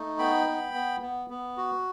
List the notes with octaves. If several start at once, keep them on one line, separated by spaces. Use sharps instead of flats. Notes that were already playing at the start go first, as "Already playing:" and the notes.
Already playing: A3 D#4
B3 G5 B5
B3
B3
B3
B3
F#4